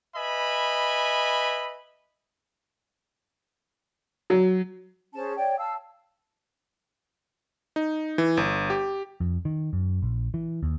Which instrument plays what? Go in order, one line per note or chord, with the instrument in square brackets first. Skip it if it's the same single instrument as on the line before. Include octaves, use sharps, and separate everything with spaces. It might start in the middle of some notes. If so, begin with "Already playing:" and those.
[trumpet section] B4 D#5 E5 G#5 B5
[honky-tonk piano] F#3
[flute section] C#4 G#4 C5 A5
C#5 D5 G5
F5 A5 E6
[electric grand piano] D#4
E3
G1
G4
[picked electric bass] F2
D#3
F#2
A#1
E3
D#2